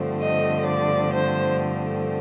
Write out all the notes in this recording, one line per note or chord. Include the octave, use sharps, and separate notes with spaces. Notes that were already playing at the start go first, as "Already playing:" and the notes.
Already playing: G2 D3 F3 A3 C4
D#5
D5
C5